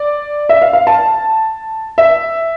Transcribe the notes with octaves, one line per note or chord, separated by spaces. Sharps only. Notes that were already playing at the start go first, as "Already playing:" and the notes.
Already playing: D5
E5
F5
F5
A5
E5